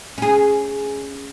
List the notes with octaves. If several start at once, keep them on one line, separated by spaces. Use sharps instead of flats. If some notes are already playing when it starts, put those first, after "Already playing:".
C#4 G#4